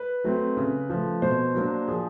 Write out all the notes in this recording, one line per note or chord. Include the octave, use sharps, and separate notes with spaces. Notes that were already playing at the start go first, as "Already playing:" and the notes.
Already playing: B4
F#3 A3 C4
C#3
F3 A3
B2 C5
F#3 A#3 D4
F3 G#4